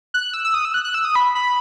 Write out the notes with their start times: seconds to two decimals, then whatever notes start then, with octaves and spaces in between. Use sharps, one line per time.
0.14 F#6
0.34 E6
0.44 E6
0.54 D#6
0.65 E6
0.74 F#6
0.84 F#6
0.94 E6
1.05 D#6
1.15 B5
1.35 B5